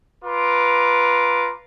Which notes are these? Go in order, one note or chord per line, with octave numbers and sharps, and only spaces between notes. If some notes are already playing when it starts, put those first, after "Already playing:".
F4 B4 A#5 D6